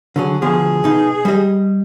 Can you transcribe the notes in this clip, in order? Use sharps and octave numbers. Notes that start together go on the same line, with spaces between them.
D3 F#3 G#4
D2 B2 F3 G#4
B2 D#4
G3 D#5